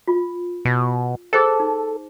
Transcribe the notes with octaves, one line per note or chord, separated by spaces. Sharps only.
F4
B2
G#4 A4 C5 G5
D#4